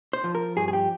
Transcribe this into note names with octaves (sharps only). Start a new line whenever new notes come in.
C5
F3
A#4
G2 G#4
G#4
G4